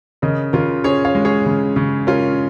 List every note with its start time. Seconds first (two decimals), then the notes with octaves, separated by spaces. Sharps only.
0.22 C#3 A#4 D#5
0.53 C#3 F4 A#4
0.84 C#4 G#4 C#5
1.05 C#5 F5
1.15 G#3
1.25 G#4 C#5
1.46 C#3
1.76 C#3
2.07 C#4 F4 A#4